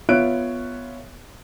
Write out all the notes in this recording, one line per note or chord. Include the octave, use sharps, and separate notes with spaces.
B3 F4 C#5 E5 F#6 D7